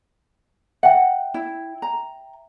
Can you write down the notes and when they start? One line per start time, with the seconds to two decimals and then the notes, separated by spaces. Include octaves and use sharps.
0.83 E5 F#5 G5
1.34 E4
1.82 A#5